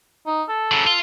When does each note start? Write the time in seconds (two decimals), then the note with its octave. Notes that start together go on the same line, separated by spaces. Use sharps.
0.27 D#4
0.49 A4
0.72 C#3 F#3
0.87 F4